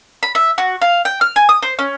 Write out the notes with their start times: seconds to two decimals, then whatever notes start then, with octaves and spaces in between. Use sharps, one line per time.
0.23 B5
0.35 E5
0.58 F#4
0.82 F5
1.05 G5
1.21 F6
1.36 G#5
1.49 D#6
1.62 C5
1.79 C#4